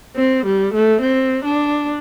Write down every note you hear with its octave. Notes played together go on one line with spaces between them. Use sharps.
C4
G3
A3
C4
D4